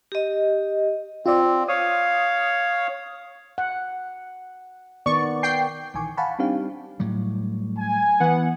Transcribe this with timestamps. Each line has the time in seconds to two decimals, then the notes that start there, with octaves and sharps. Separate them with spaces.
0.12 G4 D#5
1.26 C4 F4 D5
1.68 C#5 F5 D#6
3.58 F#5
5.06 D#3 B3 D5 C#6
5.43 G5 C7
5.94 A#1 D#3 E3 G#5 C#6 D6
6.17 F5 F#5 G#5 A5 B5 C#6
6.39 G3 C4 D4 D#4 G4 F5
7.00 A2 F#3 G3
7.78 G#5
8.20 E3 B3 F#5